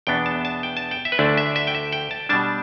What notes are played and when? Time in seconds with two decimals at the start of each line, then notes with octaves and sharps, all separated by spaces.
0.07 E2 B2 B3 D4 G5
0.26 A5
0.45 A5
0.63 G5
0.77 A5
0.91 G5
1.05 E5
1.12 B4
1.19 D2 D3 A3 D4 D5
1.37 E5
1.56 E5
1.67 G5
1.75 E5
1.93 G5
2.11 A5
2.29 B2 G3 D4 A5